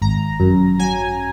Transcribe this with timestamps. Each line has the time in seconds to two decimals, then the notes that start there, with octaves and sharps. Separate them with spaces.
0.02 G#1 A#5
0.40 F#2
0.79 F#3 G#5